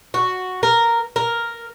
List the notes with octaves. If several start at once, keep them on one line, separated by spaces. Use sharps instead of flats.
F#4
A#4
A#4